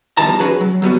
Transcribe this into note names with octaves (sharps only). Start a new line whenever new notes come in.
E2 D#3 F3 G3 A5 A#5
C#4 F#4 G#4 B4
F#3
F#3 G3 B3 F#4